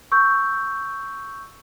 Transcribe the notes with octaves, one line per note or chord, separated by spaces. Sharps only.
C#6 E6 G6